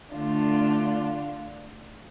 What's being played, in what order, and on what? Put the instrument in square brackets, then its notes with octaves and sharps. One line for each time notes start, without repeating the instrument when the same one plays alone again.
[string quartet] D3 A3 D4 F4